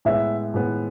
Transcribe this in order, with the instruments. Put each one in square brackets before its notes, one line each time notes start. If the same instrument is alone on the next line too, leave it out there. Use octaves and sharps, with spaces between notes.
[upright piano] A2 G#3 B3 [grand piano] E5
[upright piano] A2 G#3 B3